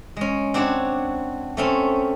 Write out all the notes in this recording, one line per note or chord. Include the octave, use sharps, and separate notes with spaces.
G#3 C#4
C4 D4 F#4 C#5
A3 C4 C#4